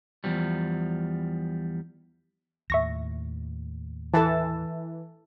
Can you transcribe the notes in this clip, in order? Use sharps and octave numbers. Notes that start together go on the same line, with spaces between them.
E2 F3 G3
D#2 A2 E5 C#6 A#6
E3 A4 A5